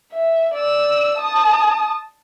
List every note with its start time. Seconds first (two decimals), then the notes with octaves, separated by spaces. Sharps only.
0.13 E5
0.55 D5 E6
1.18 A5 D#6